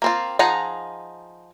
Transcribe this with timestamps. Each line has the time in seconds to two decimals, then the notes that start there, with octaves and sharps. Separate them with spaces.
0.02 A#3 C4 F4
0.39 F3 D#4 G#4 F#5 A#5